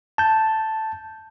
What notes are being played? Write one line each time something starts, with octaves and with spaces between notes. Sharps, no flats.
A5 G6